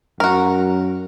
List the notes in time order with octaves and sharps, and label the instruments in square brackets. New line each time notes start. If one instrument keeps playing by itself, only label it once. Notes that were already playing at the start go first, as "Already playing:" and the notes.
[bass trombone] F#2 [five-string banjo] F#4 A#4